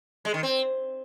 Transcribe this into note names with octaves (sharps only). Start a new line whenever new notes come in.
G#3
D#3
C4